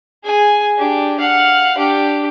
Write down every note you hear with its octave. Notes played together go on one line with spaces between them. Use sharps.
G#4 G#5
D4 G4
F5 F#5
D4 G4